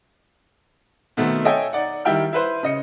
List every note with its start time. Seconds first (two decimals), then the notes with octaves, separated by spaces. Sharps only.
1.17 B2 D#3 A3 B3 C4
1.45 A4 C#5 D#5 E5 G5 G#5
1.73 D#4 D5 F#5
2.05 D#3 G3 E4 E5 G5 F6
2.33 E4 B4 C5
2.63 C#3 D#5 C#7